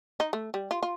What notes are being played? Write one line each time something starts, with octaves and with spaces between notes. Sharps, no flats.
D#4
A3
G3
F4
F4